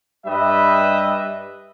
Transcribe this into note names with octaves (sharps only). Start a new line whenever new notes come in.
G2 G3 B4 D#5 E5